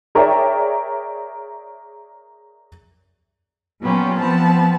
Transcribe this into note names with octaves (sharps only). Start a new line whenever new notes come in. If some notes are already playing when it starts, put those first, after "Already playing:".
G#4 A#4 C#5 D5 E5 G5
A#2 F#3 B3 C#4 F4 G4
F3 B3 C4 A5